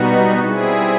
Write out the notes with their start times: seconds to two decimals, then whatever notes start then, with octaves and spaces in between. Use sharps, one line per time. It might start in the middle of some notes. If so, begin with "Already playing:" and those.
Already playing: B2 G3 B3 D#4 F#4
0.39 G3 C4 E4 G#4